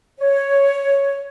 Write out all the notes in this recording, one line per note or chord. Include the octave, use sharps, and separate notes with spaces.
C#5